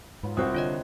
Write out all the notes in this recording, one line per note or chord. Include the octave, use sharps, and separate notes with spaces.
G#2 F#3 F4 B4
C2 C4 F#4 C5 D#6 F#6
D3 F4 C#5 D#5